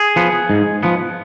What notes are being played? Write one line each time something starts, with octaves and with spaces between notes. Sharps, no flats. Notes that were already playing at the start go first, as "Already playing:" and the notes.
Already playing: G#4
F3 B3
G#2
F3 B3